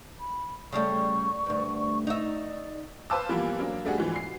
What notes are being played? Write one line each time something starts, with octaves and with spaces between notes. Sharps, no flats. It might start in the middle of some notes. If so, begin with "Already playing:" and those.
B5
C#3 G3 A3 C#6
D2 G2
D#4 D5 E5
B4 C5 F5 A5 D6 E6
E3 F3 G3 A#3 B3
F#3 A#3 D4
G3 A3 D4 F#4 G#4
G#2 E3 F3
C7